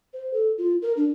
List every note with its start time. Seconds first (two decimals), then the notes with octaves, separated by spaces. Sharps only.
0.14 C5
0.34 A4
0.58 F4
0.82 A#4
0.97 D4